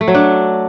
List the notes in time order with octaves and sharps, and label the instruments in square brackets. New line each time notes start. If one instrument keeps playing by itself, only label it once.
[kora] A3
F#3
D4